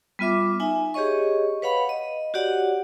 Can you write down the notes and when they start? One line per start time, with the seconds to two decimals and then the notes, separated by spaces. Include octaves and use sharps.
0.19 G3 B3 F4 E5 D6
0.60 D#4 E5 G#5
0.94 G4 G#4 C#5 D#5 C#6
1.62 B4 C#5 F5 F#5 B5
1.89 D#5
2.34 F#4 G4 C#5 D5 F#5